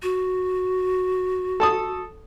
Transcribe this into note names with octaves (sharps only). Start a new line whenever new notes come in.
F#4
A4 A5 D#6